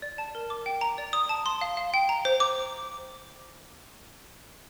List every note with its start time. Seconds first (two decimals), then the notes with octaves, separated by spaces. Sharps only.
0.02 D5
0.18 A5
0.35 A#4
0.50 D6
0.66 G5
0.81 A#5
0.98 D5
1.13 D#6
1.29 A5
1.46 C6
1.61 F5
1.77 F5
1.94 G5
2.09 A#5
2.25 C5
2.40 D6